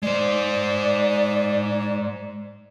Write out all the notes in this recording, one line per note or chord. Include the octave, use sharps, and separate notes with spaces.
G#3 C5 D5